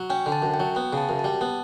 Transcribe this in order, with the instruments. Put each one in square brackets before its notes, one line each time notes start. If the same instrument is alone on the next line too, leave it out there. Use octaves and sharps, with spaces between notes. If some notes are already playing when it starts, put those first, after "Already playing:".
Already playing: [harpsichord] F#3
[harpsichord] C#4 [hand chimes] G5
[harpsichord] D3
[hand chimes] A5
[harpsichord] F#2
[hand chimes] G5
[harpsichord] F#3
[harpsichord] B3 [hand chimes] G5
[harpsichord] C#3 [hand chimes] A5
[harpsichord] F#2
[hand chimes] A5
[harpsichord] G3
B3